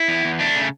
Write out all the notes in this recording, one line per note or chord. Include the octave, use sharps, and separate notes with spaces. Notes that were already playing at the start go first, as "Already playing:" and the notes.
Already playing: E4
E2
E2
A3 D4
C#3